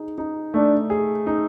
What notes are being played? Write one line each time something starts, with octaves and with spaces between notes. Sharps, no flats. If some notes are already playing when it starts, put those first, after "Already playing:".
Already playing: D#4 G#4
D#4
A3 D4
G#4
D#4